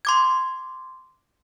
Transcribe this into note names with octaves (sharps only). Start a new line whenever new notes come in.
C6 D6 G#6